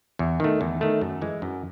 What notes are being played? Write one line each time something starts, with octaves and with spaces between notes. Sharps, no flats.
E2
D#3 A3
E2
D#3 A3
F#2
E3 G#3
F#2